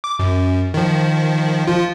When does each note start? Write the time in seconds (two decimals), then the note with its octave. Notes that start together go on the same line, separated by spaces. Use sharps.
0.04 D6
0.19 F#2
0.74 D#3 F3
1.67 F3 F4